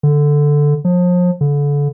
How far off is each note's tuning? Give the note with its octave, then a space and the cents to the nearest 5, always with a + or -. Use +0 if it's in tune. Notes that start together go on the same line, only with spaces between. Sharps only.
D3 +0
F3 +35
D3 -30